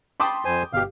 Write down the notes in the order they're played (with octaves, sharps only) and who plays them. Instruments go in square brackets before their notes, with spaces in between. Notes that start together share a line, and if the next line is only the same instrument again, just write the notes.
[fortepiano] G5 D6 D#6 [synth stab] A5 B5 C6
[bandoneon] F2 C5 G#5
[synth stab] G1 G4 [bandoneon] B2 F5